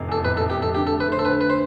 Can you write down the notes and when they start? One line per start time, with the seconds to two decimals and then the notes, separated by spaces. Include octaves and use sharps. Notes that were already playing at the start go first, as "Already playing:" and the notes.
Already playing: F1 C3
0.08 E2 A4
0.25 F1 B4
0.37 A4
0.41 F1
0.50 G4
0.59 F1 A4
0.75 D3 G4
0.87 A4
0.92 A3
1.00 B4
1.08 D3 C5
1.19 A4
1.24 D2 B4
1.41 B4
1.50 C5